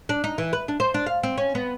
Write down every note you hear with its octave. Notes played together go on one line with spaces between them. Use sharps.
D4
D#4
E3
B4
D4
C5
D4
F5
C4
C#4
B3